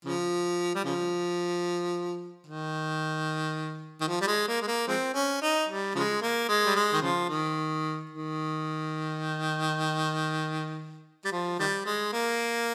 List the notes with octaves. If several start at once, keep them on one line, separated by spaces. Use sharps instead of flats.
C#3 F3
G3
C#3 F3
D#3
D#3
F3
G3
G#3
A#3
G#3
A#3
F3 G#3 C4
C#4
D#4
G3
C#3 F3 G#3
A#3
G#3
G3
G#3
D#3
C#3 F3
D#3
D#3
G3
F3
D#3 G3
G#3
A#3